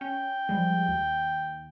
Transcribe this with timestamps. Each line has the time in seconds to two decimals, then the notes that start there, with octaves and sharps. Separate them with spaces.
0.01 C#4 G5
0.49 F3 G3 G#3
0.88 D#2